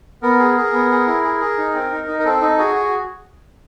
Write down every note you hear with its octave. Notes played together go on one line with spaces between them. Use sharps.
B3 A#4
G#4
G#4
B3
G#4
E4
G#4
G#4
D#4
C4
D#4
D#4
A#4
C4 A4
D#4
F#4 G#4
F#4